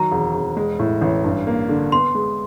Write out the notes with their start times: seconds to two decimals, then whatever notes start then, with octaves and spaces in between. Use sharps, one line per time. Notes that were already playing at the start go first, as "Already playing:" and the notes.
Already playing: D#3 F#3 A#5
0.11 E1
0.34 E1
0.57 G#3
0.79 A2
1.01 A1
1.24 G2
1.47 A#3
1.69 D3
1.92 B3 C6
2.15 G#3